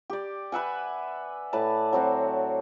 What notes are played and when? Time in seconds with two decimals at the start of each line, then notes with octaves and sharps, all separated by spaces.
0.10 G4 D5
0.52 B4 E5 F#5 G#5
1.53 A2 B4 D5 A5
1.93 F#3 C4 F#4